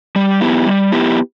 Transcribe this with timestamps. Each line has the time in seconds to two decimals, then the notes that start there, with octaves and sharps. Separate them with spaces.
0.16 G3
0.41 B3 E4 G4
0.66 G3
0.92 B3 E4 G4